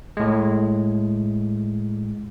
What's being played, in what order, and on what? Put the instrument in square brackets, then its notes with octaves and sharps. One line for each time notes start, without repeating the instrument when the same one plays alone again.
[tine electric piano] A2 G#3